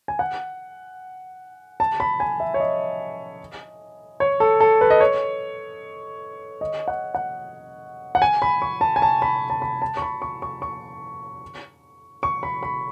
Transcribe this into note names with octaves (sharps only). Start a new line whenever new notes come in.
G#5
F#5
A5
B5
G#5
E5
C#5
D#5
C#5
A4
A4
B4
D#5
C#5
D#5
F#5
F#5
F#5
G#5
B5
C#6
A5
G#5
A5
B5
A5
B5
A5
C#6
B5
C#6
C#6
C#6
C#6
B5
B5